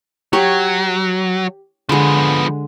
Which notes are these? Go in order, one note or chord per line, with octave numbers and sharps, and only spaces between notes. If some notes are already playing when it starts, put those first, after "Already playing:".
F#3 G4 C#5
D3 F3 G#3 B3